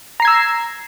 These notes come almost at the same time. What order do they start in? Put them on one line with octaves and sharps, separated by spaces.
A#5 C7 G#6 E6